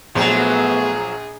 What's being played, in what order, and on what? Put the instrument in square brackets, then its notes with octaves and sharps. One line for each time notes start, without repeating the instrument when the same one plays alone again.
[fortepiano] A#1 [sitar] F3 F#3 [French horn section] A3 B3 [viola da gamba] G#4